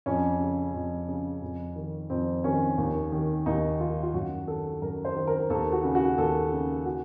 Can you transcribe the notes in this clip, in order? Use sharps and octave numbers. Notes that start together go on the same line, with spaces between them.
F2 C#4
C#3
F2
C#3
F2
D#3
F2 C4
D#3 C#4
D#2
D#3
D#2 D#4
D#3 F4
F4
F#2 F#4
D#3 A4
F#2 A#4
C5
D#3
A#4
D#2 A4
F#4
C#3
F#4
D#2 A4
C#3
F#4